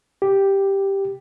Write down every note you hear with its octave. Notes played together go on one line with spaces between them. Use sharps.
G4